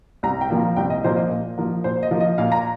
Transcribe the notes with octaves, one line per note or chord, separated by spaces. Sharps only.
C2 A#5
G5
A#2 F3 A#3
A#5
C2 G5
D#5
A#2 F3 A#3 C5
D#5
A#2
F3 A#3
A#2 C5
D#5
F3 A#3
D#5
A#2 F5
A#5